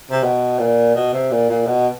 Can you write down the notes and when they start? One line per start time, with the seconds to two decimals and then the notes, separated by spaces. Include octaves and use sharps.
0.11 C3
0.23 B2
0.59 A#2
0.95 B2
1.13 C3
1.32 A#2
1.49 A#2
1.67 B2